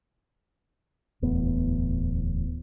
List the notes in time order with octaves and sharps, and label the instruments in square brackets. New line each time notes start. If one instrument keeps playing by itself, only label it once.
[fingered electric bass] D1 E2 A2 B3